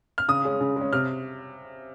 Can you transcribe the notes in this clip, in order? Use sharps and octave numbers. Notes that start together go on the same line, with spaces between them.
F6
C#3 D#6
G#3 C#4
C#3
G#3 C#4
C3 F6